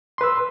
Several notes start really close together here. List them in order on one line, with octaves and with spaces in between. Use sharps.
C6 B4 E6